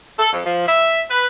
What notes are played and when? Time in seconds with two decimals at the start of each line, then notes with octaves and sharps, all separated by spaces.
0.19 A4
0.33 F2
0.46 F3
0.67 E5
1.10 B4